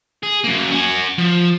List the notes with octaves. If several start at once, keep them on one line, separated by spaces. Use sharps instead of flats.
G#4
F#2 A#3
F#4 G#5
F3